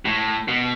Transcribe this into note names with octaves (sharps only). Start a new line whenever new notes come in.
A2
B2